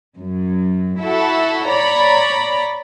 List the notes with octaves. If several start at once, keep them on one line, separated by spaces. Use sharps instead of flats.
F#2
E4 F#4 A4 E5
C#5 D5 A#5 B5